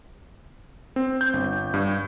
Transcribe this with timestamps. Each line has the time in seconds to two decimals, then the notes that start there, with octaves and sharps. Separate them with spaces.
0.96 C4
1.21 G6
1.33 G1
1.74 G2